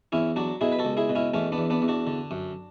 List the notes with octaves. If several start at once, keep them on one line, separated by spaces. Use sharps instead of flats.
E2 C#4 E4
F#3 D4 F#4
B2 E4 G#4
B4
F#4 A4
C#2
E4 G#4
B2
C#4 E4
E2 A3 C#4
B3 D4
E2
B3 D4
E2
D4 F#4
D3
F#2